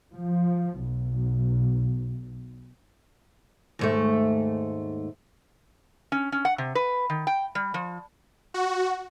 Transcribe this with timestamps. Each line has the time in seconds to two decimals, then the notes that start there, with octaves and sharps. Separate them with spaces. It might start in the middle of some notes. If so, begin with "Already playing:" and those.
0.14 F3
0.84 B1
3.79 D#2 G#2 A3
6.12 C#4
6.32 C#4
6.45 F#5
6.58 C3
6.75 B4
7.10 D#3
7.27 G5
7.55 G3
7.74 F3
8.54 F#4